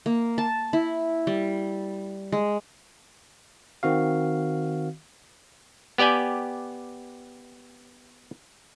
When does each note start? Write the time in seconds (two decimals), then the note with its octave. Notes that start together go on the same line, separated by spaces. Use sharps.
0.06 A#3
0.38 A5
0.73 E4
1.27 G3
2.32 G#3
3.83 D#3 C4 F#4 F5
5.98 B3 G4 D5 G5 G#5